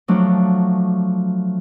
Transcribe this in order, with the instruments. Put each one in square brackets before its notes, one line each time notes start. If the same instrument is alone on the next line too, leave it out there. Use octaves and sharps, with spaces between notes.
[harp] F3 F#3 A3 D4